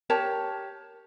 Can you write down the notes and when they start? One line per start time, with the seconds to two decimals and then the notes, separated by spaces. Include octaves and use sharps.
0.10 G4 A#4 C#5 A5